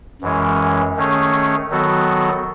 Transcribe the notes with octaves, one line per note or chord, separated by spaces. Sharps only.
F#2 E3 G#3 C#4
D#3 A3 C#4 G#4 C#5
D#3 F#3 B3 F#4 A4